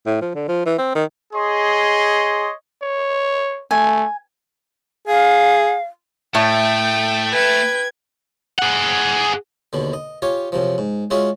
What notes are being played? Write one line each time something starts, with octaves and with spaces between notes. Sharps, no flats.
A2
F3
D3
F3
E3
C4
D#3
G#4 C#5 D#5 C6
C#5
A3 G#5
G#4 F5
A2 A3 G5
B4 G5 G#6
G#4 F#5
D#2 B2 D3
D#5
F4 G4 C#5 G#5
F#2 C3 F3
G#2
G#3 C#4 F4 F#4 G#4 E5